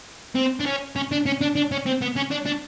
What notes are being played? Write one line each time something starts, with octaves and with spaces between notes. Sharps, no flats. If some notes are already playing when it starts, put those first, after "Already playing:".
C4
D4
C#4
C#4
D4
C#4
D4
D4
C#4
C4
B3
C#4
D4
D4